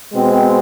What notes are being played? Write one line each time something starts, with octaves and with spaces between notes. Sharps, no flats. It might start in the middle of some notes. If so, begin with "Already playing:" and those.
B2 G#3 C4